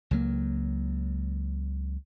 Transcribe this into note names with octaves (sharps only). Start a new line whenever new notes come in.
C#2 F#3 A#3